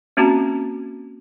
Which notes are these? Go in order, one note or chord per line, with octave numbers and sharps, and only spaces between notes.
A#3 C4 C#4 F#4 A5 A#5